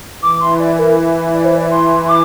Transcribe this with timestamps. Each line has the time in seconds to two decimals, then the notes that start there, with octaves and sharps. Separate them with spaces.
0.22 E3 D6
0.41 C6
0.59 D5
0.78 A#4
1.34 D5
1.45 C5
1.55 D5
1.71 C6
2.05 C6
2.09 D6